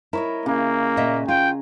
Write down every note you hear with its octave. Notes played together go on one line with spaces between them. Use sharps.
E4 A#4 C#5 D#5
C#3 A#3
A#2 D#5 E5
F4 G5